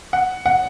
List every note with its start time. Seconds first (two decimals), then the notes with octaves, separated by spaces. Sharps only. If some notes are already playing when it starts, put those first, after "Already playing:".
0.13 F#5
0.46 F#5